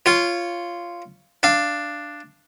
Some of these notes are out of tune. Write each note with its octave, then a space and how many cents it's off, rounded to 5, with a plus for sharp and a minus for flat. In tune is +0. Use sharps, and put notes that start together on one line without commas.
F4 -10 C#5 +0
D4 +5 F5 -15